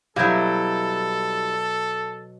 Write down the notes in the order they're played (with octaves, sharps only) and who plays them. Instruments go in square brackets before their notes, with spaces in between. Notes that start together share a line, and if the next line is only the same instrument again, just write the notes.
[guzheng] B2 F#3 [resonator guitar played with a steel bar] G3 E4 [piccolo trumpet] A4 [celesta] F5 G6 G#6